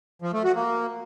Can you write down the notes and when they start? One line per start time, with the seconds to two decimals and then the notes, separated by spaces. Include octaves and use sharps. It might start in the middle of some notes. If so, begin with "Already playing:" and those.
0.22 F3
0.33 A3
0.44 F#4
0.55 A#3